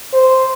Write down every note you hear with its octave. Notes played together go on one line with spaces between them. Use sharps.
C5